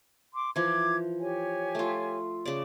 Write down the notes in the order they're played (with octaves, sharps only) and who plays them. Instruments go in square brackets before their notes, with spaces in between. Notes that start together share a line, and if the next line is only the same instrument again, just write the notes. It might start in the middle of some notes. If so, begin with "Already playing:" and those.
[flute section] C6 D6
[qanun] E3 F3 [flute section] D6 G#6
[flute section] G4 C#5 G#5
[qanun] A3 F4
C#3 D5